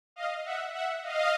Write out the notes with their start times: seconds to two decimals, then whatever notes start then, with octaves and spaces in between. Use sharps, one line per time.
0.16 D#5 F5
0.44 E5 F#5
0.74 E5 F#5
1.03 D#5 F5